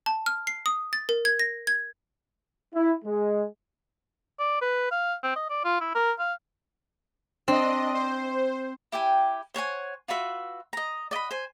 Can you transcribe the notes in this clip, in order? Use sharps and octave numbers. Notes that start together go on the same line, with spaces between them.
A5
F6
C7
D#6
A6
A#4
G#6
A#6
G#6
E4
G#3
D5
B4
F5
C4
D#5
D5
F4
E4
A#4
F5
C4 D4 D#5
C5
E4 G4 G5 G#5
C5 C#5 F#5 G#5
F4 F#4 B4 E5
D#5 A#5
D5 D#5 F#5 B5
C5 G#5